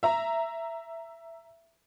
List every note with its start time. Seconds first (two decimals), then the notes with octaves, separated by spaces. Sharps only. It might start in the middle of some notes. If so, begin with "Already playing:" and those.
0.03 E5 A#5